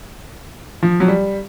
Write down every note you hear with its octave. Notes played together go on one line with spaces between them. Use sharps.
F3
F#3
G3